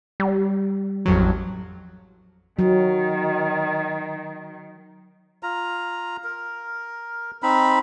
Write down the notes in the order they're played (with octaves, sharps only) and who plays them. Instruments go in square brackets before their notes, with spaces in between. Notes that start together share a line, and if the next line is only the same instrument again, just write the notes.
[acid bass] G3
[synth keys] A1 F2 F#3
[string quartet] D#3 [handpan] F#3
[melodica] F4 A#5
A#4
C4 D#4 B5